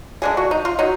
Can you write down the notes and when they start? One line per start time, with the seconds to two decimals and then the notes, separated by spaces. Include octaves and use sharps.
0.22 D3 G#3 D4 G#4
0.37 F#4
0.51 D#4
0.65 F4
0.79 F#3 D#4